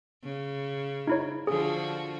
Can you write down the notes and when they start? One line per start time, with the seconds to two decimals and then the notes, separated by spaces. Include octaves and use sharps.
0.24 C#3
1.07 D#4 E4 C#5
1.47 D3 F3 F#4 G#4